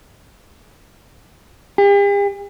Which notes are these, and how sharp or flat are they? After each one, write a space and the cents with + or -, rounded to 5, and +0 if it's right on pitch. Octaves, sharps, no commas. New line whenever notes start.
G4 +45